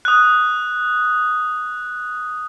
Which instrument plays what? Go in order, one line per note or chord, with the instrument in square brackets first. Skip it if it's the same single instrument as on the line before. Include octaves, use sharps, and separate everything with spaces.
[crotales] D#6 F#6